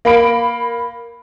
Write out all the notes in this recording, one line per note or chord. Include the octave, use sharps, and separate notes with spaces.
A#3 B5 D7